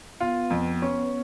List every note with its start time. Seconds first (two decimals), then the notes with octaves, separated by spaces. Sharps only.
0.20 B3 F4
0.50 F2
0.82 C#4